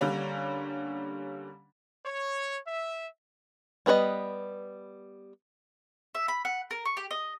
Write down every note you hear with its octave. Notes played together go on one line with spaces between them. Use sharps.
D3 G3 A#3 C#4
C#5
E5
G3 B3 B4 C#5 D#5
E5
B5
F#5
A#4
C#6
G4
D#5